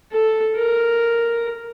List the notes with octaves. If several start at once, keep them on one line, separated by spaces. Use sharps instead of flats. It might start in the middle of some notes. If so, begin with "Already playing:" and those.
A4
A#4